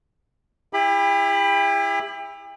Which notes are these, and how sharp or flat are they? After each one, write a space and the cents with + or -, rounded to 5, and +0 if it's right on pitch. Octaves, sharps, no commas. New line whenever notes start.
E4 +0 G4 +40 B5 +0